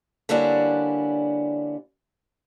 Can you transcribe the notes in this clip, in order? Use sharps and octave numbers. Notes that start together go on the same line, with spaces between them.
D3 G3 A#3 C#4 D4 E4